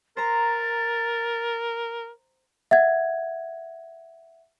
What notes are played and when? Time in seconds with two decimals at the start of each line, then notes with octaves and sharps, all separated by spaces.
0.17 A#4 C5 A#5 A6
2.71 E5 F#5 G#6